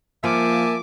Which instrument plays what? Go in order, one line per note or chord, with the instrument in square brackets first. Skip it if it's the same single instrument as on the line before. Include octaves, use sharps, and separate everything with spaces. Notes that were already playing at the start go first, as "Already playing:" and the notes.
[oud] F3 [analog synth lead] A#3 [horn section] E5 G#5 A5 [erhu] D6